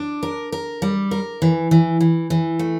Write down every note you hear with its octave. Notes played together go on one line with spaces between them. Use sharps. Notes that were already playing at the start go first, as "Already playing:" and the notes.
Already playing: D4
A#4
A#4
G3
A#4
E3
E3
E3
E3
A3